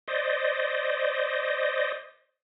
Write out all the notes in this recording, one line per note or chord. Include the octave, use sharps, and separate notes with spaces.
C5 D5 D#5